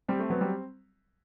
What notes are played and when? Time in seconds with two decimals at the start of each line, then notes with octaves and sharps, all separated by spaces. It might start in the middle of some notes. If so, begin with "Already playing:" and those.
0.08 G3 C4
0.20 A3
0.30 F#3 B3
0.41 G3